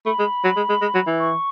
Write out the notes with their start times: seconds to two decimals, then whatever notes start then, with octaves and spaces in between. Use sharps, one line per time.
0.06 A3 B5
0.19 G#3
0.44 F#3
0.56 G#3
0.69 G#3
0.82 G#3
0.94 F#3
1.07 E3
1.20 C#6